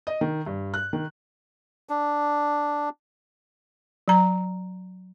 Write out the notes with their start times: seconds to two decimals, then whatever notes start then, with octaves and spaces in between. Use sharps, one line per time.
0.07 D#5
0.21 D#3
0.46 G2
0.74 F#6
0.93 D#3
1.89 D4
4.08 F#3 A#5